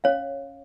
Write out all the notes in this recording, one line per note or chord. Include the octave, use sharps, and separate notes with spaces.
C#4 C#5 F5